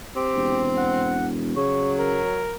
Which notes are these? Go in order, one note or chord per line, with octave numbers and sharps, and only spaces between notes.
C4 G4
E1
F#5
C#3 F#3 C#5
A#4